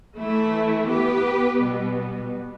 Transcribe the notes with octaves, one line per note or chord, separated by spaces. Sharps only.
E3 A3 E4
B3 G4 B4
B2 G3 B3